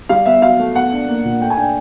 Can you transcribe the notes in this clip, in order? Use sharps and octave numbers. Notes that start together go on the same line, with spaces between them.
G3 F5
B3 E5
F#3 F5
A3
B3 F#5
D4
A#3
A#2
A3 G5
G#5
D4 G5